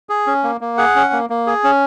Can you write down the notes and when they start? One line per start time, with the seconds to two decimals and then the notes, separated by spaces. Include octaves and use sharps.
0.09 G#4
0.27 C#4
0.43 A#3
0.61 A#3
0.77 G#4 F#5
0.96 C#4
1.13 A#3
1.30 A#3
1.47 G#4
1.64 C#4